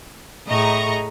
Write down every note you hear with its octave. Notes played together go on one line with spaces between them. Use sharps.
A2 A3 G#4 D#5 A#5 C#6